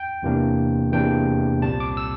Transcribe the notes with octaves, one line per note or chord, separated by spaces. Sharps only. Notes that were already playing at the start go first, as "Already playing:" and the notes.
Already playing: G5
E2 C3 E3 A#3 D4
E2 C3 E3 A#3 D4 G5
C2 A#2 G3 C4 A5
D6
E6